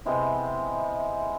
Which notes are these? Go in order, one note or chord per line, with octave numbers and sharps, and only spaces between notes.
C3 G#3 B3 E4